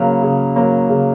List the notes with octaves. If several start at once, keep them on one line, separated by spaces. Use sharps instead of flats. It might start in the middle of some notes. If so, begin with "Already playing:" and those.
Already playing: C#3 F#3 A#3
C#3
F#3 A#3
C#3